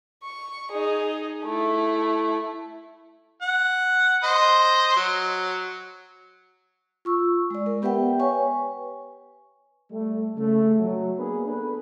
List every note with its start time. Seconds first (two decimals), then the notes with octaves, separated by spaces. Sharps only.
0.23 C#6
0.72 D#4 G#4
1.43 A3 E4
3.42 F#5
4.24 C5 D#5
4.97 F#3
7.05 F4 C#6 E6
7.50 G#3 D5
7.66 A#4
7.82 B3 G4 B4 E5 F#5 G5
8.19 B4 C#5 G#5 C#6
9.91 G3 A3
10.37 C#3 A3
10.78 F#3
11.17 A#3 B3 D4 G#4 A#4 B4
11.46 B3 D4 A4 B4